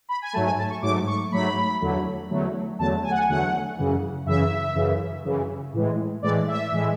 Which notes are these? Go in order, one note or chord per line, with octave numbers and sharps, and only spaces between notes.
B5
G#5
G#2 F#3 A3 A5
G#5
A5
C#6
G#2 F#3 A3 D6
C#6
G#2 F#3 A3 B5
E2 D3 F#3 A3
E2 D3 F#3 A3
E2 D3 F#3 A3 A5
G#5
F#5
G#5
E2 D3 F#3 A3 F#5
F#2 C#3 E3
F#2 C#3 E3 E5
F#2 C#3 E3
F#2 C#3 E3
A2 E3 G#3
A2 E3 G#3 D5
E5
A2 E3 G#3